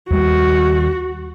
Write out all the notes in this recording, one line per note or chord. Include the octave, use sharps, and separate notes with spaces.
D#2 G3 F#4